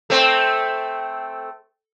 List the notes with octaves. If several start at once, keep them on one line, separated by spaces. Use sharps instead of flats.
A3 C4